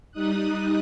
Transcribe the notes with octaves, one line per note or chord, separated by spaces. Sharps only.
G3 D#4 D#6 F#6